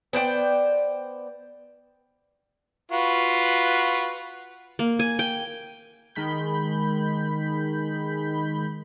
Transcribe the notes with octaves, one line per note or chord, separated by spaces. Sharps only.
B3 C5 D5 G5
F4 F#4 B4
A#3
G#5
G5
D#3 G#3 B5 G6